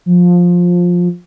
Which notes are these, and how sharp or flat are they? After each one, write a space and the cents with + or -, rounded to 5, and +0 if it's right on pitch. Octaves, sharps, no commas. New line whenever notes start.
F3 +15